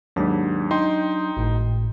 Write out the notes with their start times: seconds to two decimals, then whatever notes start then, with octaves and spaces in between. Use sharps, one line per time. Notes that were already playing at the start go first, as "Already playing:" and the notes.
0.16 D#2 G#2 F#3 D4
0.71 D#4 G5 C6
1.37 G#1 A2